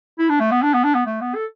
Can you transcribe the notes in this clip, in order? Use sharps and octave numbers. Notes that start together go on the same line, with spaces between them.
E4
D4
A3
B3
D4
B3
D4
B3
A3
B3
A4